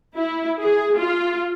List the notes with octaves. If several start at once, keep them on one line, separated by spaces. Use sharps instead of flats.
E4
G#4
F4